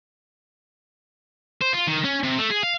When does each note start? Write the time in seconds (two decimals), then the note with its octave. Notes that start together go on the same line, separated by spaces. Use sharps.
1.62 C5
1.73 F4
1.87 D#3
2.05 C#4
2.23 C3
2.38 A3
2.50 G#4
2.63 F5